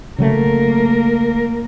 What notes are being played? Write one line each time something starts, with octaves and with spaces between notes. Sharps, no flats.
C#3 F#3 A3 A#3 A#4